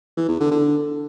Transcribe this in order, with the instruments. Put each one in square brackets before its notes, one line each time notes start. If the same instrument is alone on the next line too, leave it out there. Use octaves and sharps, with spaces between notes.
[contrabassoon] E3
E2
D3
D3